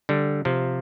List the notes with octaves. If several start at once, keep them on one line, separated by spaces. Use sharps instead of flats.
D3 G3
C3 F3